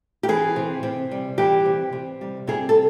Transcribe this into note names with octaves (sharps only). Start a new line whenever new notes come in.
G4
E3 G#4
C3
C3
G3
E3 G4
C3
C3
G3
C3 G#4
A4